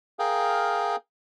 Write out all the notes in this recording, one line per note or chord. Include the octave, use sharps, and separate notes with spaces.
G#4 A#4 F5 G5